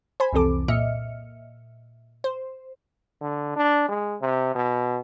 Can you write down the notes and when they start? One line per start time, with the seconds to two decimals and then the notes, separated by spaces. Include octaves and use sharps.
0.20 C5 G#5 B5
0.33 C2 F2 E3 C4 A4 D6
0.68 A#2 D#5 E5 F6 C#7
2.24 C5
3.21 D3
3.56 D4
3.88 G#3
4.21 C3
4.55 B2